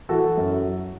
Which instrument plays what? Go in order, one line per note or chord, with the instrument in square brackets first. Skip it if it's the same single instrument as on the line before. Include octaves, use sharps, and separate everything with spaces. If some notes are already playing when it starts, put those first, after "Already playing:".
[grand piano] E3 F#4 A4
F#2